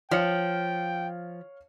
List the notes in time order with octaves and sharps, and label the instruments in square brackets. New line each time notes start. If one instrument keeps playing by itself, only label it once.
[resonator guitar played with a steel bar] F3 [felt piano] C#5 F5 C#7 [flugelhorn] G5